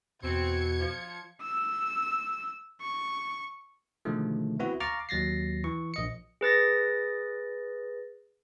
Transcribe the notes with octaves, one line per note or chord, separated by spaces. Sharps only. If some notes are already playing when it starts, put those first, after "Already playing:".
E2 B2 C4 G#6 C#7
F3
E6
C#6
B2 D3 D#3 F3 G#3 A3
B3 C4 E4 F#4 B4
F5 A#5 C#6 D6 F6 A6
D#2 F#3 A6 A#6 C7
E3 C#6
A#1 D#5 C#7
G#4 B4 A6 A#6